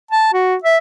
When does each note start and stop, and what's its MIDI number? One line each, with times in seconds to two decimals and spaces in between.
0.11 0.32 81
0.33 0.55 66
0.63 0.78 76